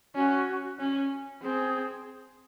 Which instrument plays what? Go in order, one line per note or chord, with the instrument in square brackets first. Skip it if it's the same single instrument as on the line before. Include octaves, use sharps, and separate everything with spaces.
[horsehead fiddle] C#4 [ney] F#4
[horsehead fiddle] C#4
[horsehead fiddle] C4 [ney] G#4